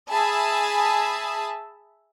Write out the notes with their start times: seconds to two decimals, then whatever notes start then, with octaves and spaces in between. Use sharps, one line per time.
0.10 G#4 E5 G#5 A5 B5 D#6